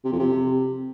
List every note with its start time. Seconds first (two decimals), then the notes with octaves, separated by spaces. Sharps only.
0.05 C3
0.12 F2
0.19 C3